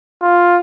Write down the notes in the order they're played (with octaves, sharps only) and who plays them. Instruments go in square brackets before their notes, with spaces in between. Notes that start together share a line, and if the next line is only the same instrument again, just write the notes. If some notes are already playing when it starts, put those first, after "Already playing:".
[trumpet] F4